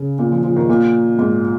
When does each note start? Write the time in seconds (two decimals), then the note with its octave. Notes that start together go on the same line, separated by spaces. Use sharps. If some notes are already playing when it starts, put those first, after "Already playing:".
Already playing: C#3
0.19 A#2
0.32 F3
0.44 F3
0.56 D#3
0.69 A#2
1.19 G#2